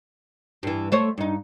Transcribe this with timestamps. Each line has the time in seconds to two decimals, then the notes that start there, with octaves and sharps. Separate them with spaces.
0.63 G2 E3
0.92 A3 C5 C#5
1.18 G2 D#4